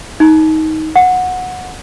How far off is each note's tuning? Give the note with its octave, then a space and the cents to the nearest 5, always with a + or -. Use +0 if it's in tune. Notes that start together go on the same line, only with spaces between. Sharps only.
D#4 +20
F#5 -15